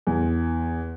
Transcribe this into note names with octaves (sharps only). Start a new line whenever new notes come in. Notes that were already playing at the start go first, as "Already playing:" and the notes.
E2